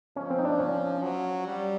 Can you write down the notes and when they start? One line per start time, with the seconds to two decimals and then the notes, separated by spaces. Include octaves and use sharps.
0.16 F3 C#4
0.30 C4
0.39 D#4
0.45 D4
0.59 C#4
1.03 F#3
1.46 G3